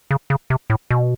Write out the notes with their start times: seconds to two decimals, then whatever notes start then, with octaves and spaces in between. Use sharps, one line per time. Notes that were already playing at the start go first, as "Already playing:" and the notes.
0.11 C#3
0.30 C#3
0.50 C3
0.70 A2
0.91 B2